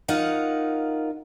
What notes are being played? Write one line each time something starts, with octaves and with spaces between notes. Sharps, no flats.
D#4 F4 A#4 F#5